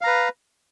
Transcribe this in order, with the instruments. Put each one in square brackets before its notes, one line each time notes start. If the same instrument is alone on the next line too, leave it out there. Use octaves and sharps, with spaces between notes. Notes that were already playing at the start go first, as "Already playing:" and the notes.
[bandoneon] F5
A#5
B4